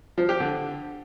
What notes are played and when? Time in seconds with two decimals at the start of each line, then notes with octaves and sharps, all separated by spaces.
0.18 F3
0.29 G4
0.40 D3